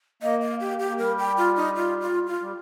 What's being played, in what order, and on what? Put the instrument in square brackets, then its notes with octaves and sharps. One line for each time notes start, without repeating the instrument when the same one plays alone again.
[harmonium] A#3 [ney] D#5
[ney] F5
G4
G4
[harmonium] A#3
[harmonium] G3 [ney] A#4
[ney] G5
F4
D#4
F4
F4
F4
[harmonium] G3